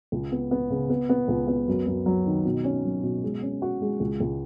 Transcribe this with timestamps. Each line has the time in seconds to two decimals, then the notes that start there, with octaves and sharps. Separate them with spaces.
0.12 C#2
0.32 B3
0.51 B3
0.70 C#3
0.90 B3
1.09 B3
1.28 C#2
1.48 B3
1.68 F#2
1.87 F#2
2.06 F#3
2.26 D#3
2.45 B2
2.64 C#4
2.85 F#3
3.03 B2
3.23 G#3
3.42 C#4
3.62 F#4
3.81 G#3
4.00 C#2
4.20 C#2